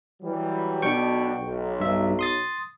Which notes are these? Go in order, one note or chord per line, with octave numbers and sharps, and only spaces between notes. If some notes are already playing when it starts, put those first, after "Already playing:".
E3 F#3 G3
B1 B2 D4 G5 C#6
B1
G2 E5
C6 D#6 A6